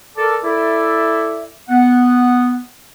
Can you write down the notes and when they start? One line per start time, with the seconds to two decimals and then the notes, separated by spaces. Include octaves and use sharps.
0.17 A4 A#4 D5 A5
0.44 E4 A4 D5 E5
1.69 B3 F#5